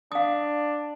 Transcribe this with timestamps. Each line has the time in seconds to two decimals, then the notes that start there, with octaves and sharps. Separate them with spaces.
0.12 D4 F5 D#6